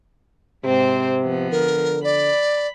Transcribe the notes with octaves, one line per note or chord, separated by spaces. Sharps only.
G#2 C3 C4 C5
F3 B3
D3 A#4
D5 B5